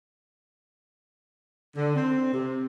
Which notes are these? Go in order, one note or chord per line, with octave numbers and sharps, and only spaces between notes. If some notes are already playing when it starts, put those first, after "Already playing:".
D3
C4
C3